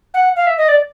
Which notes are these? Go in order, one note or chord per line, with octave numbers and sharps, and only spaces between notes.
F#5
F5
E5
D#5
D5